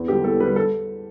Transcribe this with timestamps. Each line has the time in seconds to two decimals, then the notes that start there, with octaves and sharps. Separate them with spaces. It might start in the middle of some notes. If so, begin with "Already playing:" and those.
Already playing: E2
0.08 D3 G3 G4
0.24 E2 A4
0.40 D3 G3 B4
0.56 A4